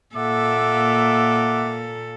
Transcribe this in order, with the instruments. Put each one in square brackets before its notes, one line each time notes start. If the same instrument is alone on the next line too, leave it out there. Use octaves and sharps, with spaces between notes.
[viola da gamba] A#2 A#3 A4 [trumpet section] E5 F#5 D6